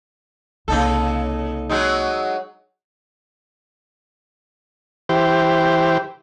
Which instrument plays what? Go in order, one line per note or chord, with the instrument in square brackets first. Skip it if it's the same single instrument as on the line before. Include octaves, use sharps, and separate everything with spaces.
[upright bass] C2 A#3 [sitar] C#3 D#4 A4
[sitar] F#3 G#3 D#4
[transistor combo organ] E3 G4 C5